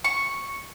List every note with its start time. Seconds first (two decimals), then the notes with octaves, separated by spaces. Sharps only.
0.04 C#6